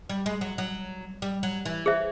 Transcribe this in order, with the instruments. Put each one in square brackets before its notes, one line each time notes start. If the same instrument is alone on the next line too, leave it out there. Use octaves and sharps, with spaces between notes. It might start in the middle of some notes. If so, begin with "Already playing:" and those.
[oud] G3
G#3
F#3
F#3
G3
F#3
E3
[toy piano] G#4 C5 E5